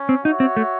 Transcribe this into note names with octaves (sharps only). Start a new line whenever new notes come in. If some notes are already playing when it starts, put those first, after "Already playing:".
Already playing: C#4
C4
D#4 F#4 C#5 E5
C4
A3